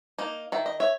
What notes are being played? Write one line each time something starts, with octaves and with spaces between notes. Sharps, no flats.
A#3 D#4
D#3 E5
D#5
C#5 E5